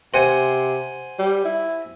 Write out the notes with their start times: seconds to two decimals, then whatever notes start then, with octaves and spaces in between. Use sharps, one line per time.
0.14 C3 C5 F#5 G#5
1.19 G3
1.44 E4